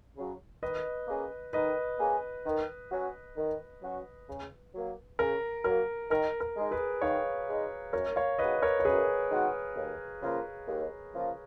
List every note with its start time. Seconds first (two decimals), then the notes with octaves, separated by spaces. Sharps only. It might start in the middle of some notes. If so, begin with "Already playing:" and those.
0.17 C#3 F#3
0.63 D#3 B4 D#5
1.07 A#3 C#4 G#4
1.53 D#3 B4 D#5
1.99 A#3 C#4 G#4
2.46 D#3
2.90 F#3 C#4 F#4
3.37 D#3
3.82 F#3 C#4 F#4
4.28 C#3
4.74 F#3 A#3
5.19 C#3 A#4
5.64 F#3 A#3 A#4
6.10 D#3 A#4
6.41 A#4
6.57 G#3 D#4
6.71 G#4 B4
7.02 D#3 C#5 F5
7.48 G#3 D#4
7.93 F#2 A#4 C#5
8.16 C#5 F5
8.39 D#3 G#3 B3 F#4 B4 D#5
8.62 A#4 C#5
8.80 C#5
8.85 F#2 G#4 B4
9.31 D#3 G#3 B3 F#4
9.76 D#2
10.22 C#3 F3 A#3 F4
10.67 D#2
11.13 C#3 F3 A#3 F4